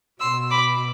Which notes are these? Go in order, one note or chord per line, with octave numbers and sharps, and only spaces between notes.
B2 C6 E6
B5 D6